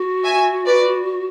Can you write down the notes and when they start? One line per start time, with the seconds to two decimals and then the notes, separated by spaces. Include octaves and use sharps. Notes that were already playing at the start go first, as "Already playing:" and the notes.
Already playing: F#4
0.24 E5 G#5
0.66 B4 D5